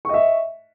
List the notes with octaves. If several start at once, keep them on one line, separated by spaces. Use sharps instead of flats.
D#5 E5 C#6